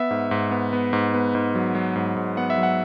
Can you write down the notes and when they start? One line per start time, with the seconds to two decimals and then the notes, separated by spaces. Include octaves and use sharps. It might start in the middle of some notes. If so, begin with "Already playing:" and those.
Already playing: B3 E5
0.11 G#2
0.31 G#2
0.51 B3
0.73 B3
0.93 G#2
1.14 B3
1.35 G#2
1.55 F#3
1.75 F#3
1.96 G#2
2.16 G#2
2.37 B3 F#5
2.50 E5
2.58 F#3
2.63 F#5